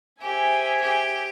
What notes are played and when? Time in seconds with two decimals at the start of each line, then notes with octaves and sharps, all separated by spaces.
0.21 G4 G#4 C5 E5 G#5
0.81 G4